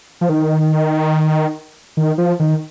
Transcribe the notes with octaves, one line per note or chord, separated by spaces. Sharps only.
F3
D#3
D#3
F3
D#3